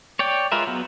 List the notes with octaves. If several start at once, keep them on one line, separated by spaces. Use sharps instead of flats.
C#5 D5 G5
G#3 F4 A#4 B4 E5
F#3 B3